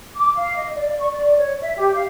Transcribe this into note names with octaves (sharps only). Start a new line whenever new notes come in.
D6
F5
D#5
D5
C#6
D5
C#5
E5
G4
F5